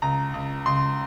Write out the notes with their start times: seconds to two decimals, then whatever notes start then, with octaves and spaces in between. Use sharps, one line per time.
0.02 C#2 A#5
0.34 C#2
0.66 C#2 C6